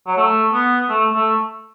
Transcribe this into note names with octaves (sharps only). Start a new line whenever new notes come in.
F#3
A3
B3
A3
A3